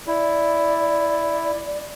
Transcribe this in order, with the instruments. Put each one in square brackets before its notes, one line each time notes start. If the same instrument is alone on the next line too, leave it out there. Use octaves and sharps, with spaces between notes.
[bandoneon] E4 [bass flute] D5